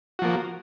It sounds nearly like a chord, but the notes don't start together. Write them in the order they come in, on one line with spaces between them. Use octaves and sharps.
F#4 F3 A#3